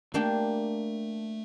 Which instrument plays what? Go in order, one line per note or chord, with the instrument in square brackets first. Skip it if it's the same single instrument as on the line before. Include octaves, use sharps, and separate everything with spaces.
[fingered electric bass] A3 [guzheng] A#3 D4 G4